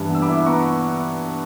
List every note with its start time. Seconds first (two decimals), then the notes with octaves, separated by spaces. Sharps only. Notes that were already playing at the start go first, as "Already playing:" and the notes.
Already playing: G2 E3
0.10 B3 E6
0.22 B5 D6
0.28 E4
0.46 B3 A#5 C#6